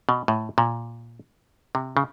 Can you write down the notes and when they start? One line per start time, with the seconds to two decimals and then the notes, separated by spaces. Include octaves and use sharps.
0.09 B2
0.28 A2
0.58 A#2
1.75 C3
1.97 C#3